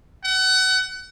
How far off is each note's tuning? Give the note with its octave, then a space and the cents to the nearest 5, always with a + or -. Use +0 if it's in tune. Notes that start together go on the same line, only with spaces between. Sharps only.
F#5 +30